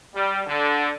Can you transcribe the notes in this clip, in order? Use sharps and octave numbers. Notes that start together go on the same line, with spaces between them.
G3
D3